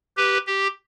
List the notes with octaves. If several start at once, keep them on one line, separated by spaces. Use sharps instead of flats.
G4 B4
G4